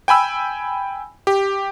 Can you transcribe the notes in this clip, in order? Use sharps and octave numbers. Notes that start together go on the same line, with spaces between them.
G5 G#5 B5 E6
G4